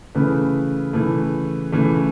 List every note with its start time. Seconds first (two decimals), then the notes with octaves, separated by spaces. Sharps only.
0.15 C#3 E3 A3 B4
0.93 C#3 E3 A3
1.72 C#3 E3 A3